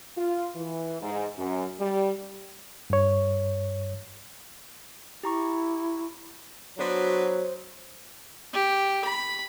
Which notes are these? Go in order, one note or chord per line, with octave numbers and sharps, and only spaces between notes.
F4
E3
G#2
F#2
G3
G2 C#5
E4 G4 A#5 C#6
F#3 B3 D4 F#4 C5
G4
B5